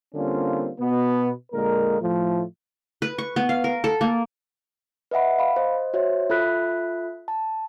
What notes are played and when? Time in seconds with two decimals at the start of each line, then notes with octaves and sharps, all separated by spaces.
0.15 D3 G3 A#3 C4 C#4 F4
0.80 B2 B3
1.53 A#2 D3 G#3 A#3 A#4
2.01 A2 F3 A3
3.02 B4
3.18 C#6
3.36 B3
3.49 F5
3.64 A#4
3.84 A4
4.01 A#3
5.11 B4 D#5 E5 F#5 B5
5.38 F5 B5
5.56 C5 D#5
5.94 F#4 C5 C#5 E5
6.30 F4 A4 E5 B5 F#6 B6
7.28 A5